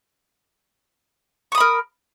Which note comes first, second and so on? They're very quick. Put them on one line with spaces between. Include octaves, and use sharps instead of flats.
C#6 D#6 B5 A#4